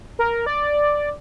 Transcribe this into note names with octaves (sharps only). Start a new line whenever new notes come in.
A#4
D5